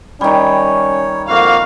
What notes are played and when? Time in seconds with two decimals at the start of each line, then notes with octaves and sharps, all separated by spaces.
0.21 D#3 G3 C#4 C#5
1.29 F2 A#3 F#4 F5